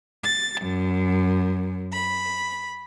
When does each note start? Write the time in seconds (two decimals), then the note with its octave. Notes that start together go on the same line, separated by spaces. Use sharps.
0.24 A6
0.62 F#2
1.94 B5